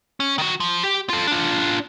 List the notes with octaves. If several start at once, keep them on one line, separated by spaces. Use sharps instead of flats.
C#4
D#3 F#4
F3
G4
F4 A4
D4 F4